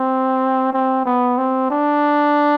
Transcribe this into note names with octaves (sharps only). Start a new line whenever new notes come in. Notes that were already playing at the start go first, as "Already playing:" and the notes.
Already playing: C4
C4
B3
C4
D4